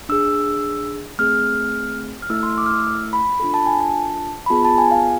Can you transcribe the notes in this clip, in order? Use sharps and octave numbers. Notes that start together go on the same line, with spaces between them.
D4 G#4 E6
A3 C4 G#4 F6
F6
A3 E4 A4 E6
C6
D6
F6
E6
B5
D4 F4 A4 B5
A5
G#5
A5
B5
B3 F4 G#4 A5
A5
G#5
F5